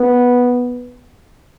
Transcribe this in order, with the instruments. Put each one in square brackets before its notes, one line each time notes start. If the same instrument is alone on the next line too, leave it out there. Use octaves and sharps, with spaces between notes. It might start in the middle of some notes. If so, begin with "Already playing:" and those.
Already playing: [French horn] B3